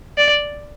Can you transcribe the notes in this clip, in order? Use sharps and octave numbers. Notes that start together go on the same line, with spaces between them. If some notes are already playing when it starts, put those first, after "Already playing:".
D5